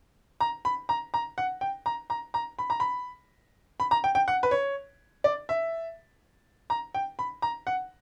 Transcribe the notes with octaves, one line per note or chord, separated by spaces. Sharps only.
A#5
B5
A#5
A#5
F#5
G5
A#5
A#5
A#5
B5
A#5
B5
B5
A#5
G5
G5
F#5
B4
C#5
D5
E5
A#5
G5
B5
A#5
F#5